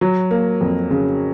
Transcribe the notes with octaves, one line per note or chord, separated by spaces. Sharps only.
F#3
A#3
F2
C#3